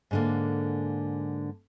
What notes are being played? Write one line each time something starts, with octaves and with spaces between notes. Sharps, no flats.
G#2 D3 A#3